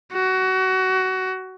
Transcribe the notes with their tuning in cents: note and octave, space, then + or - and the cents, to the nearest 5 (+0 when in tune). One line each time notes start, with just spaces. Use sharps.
F#4 +20